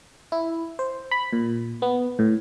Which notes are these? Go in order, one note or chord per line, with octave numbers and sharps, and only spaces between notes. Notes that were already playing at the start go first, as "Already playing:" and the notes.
E4
C5
B5
A#2
B3
A2